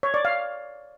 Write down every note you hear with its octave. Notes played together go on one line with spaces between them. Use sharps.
C#5
D5
F5